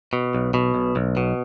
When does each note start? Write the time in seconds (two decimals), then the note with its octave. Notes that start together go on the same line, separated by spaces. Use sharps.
0.13 B2
0.35 B1
0.54 B2
0.75 B1
0.96 B1
1.17 B2